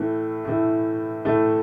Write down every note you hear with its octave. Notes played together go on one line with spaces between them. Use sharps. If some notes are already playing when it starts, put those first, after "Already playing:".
Already playing: A2 E3 A3
A2 E3 A3
A2 E3 A3